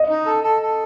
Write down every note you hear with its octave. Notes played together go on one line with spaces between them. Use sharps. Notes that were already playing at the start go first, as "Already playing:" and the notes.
Already playing: D#5
D#4
A4
A4
A4